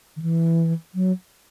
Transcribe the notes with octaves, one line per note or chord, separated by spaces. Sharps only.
D#3
E3
F#3